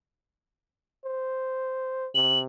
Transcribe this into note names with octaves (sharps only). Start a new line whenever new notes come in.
C5
C3 F#7